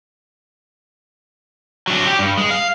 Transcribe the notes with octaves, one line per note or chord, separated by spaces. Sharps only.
F#3 D4
G4
G2
G#3
F5